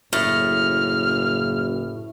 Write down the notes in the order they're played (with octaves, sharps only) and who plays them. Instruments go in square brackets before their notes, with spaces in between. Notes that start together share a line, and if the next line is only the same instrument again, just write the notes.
[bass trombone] F#1 [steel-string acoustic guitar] A2 [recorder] F6